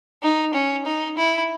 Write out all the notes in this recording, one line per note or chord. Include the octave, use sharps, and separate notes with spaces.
D#4
C#4
D#4
E4